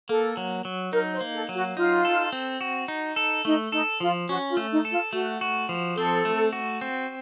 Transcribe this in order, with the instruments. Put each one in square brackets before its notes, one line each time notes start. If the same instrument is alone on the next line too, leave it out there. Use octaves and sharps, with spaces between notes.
[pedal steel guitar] A#3 [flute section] A4
[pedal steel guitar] F#3
F#3
[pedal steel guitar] D#4 [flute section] A#4
[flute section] C5
[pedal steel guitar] A#3
[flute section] A4
[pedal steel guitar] F#3
[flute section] F#4
[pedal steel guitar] D#4 [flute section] F4
[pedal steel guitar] A4
C4
F#4
D#4
A4
[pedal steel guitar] A3 [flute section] D#4
[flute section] D#4 [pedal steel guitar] A4
[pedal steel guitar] F3 [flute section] F4
[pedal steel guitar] C#4 [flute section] F#4
[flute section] F4
[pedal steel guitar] A3
[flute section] D#4
[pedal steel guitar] A4
[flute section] F4
[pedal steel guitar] A3 [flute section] F#4
[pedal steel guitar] F#4
F3
[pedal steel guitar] C4 [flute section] A4
[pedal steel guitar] A3
F#4
C4